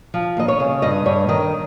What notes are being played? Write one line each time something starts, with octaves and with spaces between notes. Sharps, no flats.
F3
D#2 D#5
C#5
C#3
G2 D#5
G2 C#5
D#3 D#5